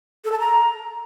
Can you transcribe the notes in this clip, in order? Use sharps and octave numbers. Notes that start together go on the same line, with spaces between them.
A4
A5
A#5